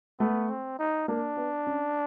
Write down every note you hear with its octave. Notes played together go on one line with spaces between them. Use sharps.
A3 B3
C4
D#4
A#3 D4
B3
C#4